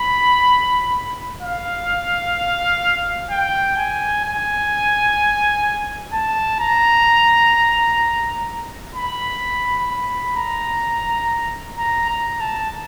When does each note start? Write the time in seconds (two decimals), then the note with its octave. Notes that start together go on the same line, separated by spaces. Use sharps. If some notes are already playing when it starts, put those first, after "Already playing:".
Already playing: B5
1.42 F5
3.31 G5
3.77 G#5
4.25 G#5
6.13 A5
6.60 A#5
8.96 B5
9.89 B5
10.37 A#5
11.78 A#5
12.09 A#5
12.41 A5